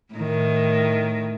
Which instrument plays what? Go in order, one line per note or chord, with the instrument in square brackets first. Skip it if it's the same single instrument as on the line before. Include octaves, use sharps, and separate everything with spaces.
[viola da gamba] A2 D#3